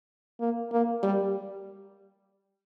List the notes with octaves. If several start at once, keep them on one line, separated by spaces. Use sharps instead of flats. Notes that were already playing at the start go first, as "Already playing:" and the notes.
A#3
A#3
G3